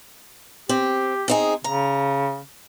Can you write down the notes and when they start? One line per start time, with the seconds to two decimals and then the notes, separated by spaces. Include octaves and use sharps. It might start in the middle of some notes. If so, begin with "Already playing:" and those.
0.69 C4 G4
1.28 C4 D#4 G#4
1.64 C#3 A#5